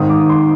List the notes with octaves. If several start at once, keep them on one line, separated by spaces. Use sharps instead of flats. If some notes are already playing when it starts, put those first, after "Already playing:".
Already playing: G#1 G#2 D#3 D#6
D6
C6